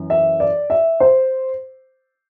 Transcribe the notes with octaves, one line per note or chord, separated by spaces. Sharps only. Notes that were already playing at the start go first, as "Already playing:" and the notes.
Already playing: F#2 E3
E5
D5
E5
C5